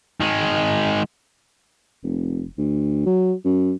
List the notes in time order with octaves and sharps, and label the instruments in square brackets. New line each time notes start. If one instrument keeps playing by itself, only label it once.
[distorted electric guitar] D#3 G#3
[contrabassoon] F1
D2
F#3
F#2